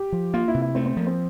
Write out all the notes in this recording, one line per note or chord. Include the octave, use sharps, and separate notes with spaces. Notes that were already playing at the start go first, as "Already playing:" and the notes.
Already playing: G4
F3
A#3 F4
E4
C3
E4
A3 C4
C4
F3 A#3
C4